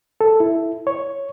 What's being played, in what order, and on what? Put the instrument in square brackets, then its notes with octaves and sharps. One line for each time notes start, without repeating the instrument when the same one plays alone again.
[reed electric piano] A4
E4
C#5